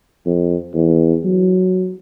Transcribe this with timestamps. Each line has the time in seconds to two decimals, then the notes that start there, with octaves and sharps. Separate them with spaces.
0.26 F2
0.75 E2
1.25 F#3